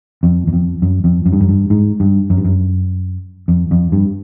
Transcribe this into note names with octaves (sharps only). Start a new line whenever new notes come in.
F2
E2
F2
F#2
F2
F#2
G2
F#2
G2
G#2
G2
F#2
G2
F#2
F2
F2
G2